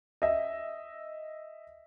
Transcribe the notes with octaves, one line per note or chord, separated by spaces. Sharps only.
D#5 E5